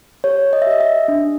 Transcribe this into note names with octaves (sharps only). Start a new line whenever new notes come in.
G4 C#5
D#5
E5
G4 D#5
E5
D4